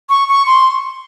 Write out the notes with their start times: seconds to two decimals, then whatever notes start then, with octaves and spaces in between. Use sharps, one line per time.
0.09 C#6
0.28 C#6
0.46 C6